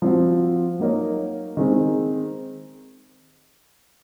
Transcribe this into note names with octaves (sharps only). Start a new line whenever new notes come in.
F3 C4 F#4
F#3 A#3 D#4 A#4 C#5
D#3 G#3 C4